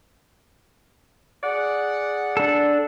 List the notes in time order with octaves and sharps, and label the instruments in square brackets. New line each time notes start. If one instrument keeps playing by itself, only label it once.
[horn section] G#4 D5 F#5
[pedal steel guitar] D4 A4